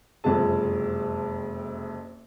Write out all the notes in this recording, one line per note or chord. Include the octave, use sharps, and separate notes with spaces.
F#1 F2 C3 G#3 A5